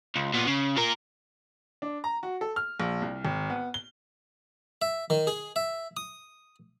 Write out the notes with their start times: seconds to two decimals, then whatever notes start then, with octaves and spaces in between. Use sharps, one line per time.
0.16 C#2
0.34 A#2 B3
0.47 C#3
0.77 F4 A#4
1.82 D4
2.04 A#5
2.23 F#4
2.41 A4
2.56 F6
2.80 A#1
3.02 C2
3.25 G#1
3.50 B3
3.74 G7
4.82 E5
5.10 D#3
5.27 G#4
5.56 E5
5.97 D#6